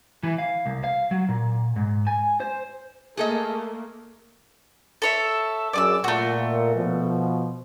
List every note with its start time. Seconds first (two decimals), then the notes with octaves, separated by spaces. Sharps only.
0.23 E3
0.38 F5
0.66 C2
0.84 F5
1.11 F#3
1.29 A#2
1.76 G#2
2.07 G#5
2.40 C5
3.17 A3 A#3 G#4 A4 D#5
5.02 A4 C#5 E5
5.73 F#2 D4 G#4 D5 D6 E6
6.04 A#2 A3 F#4
6.75 B2 F3